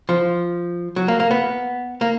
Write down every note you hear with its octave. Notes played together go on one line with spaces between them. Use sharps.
F3
F#3
A#3
A#3
B3
A#3